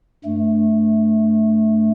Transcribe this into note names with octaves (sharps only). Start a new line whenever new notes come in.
G2 A3